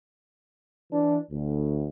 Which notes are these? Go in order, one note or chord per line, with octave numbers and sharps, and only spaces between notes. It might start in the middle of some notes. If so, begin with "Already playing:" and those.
E3 D4
D2